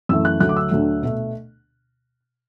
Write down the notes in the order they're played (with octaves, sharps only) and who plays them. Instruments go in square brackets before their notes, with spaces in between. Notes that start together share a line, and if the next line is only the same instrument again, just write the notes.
[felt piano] F#2 E3 A3 E6
F#6
D2 D3 F#3 A3 F#6
D6
E6
D2 D3 F#3 A3
B2 A3